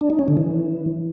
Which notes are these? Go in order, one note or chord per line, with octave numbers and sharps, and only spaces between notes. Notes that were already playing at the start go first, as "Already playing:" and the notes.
D4
D#4
C#4
D3
E3